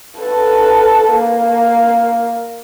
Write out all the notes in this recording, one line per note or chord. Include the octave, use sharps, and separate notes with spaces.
A4 B4
A#3